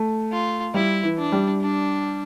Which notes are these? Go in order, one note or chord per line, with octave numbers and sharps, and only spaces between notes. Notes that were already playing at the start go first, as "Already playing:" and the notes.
Already playing: A3
F4
G3 E4
E3
D4
G3
D4